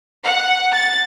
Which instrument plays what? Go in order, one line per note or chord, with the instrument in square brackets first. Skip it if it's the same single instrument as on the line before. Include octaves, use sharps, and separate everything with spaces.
[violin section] F#5
A6